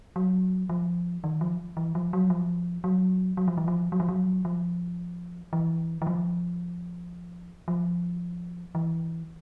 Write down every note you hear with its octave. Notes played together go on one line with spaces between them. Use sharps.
F#3
F3
D#3
F3
E3
F3
F#3
F3
F#3
F#3
F3
E3
F3
F#3
F3
F#3
F3
E3
E3
F3
F3
E3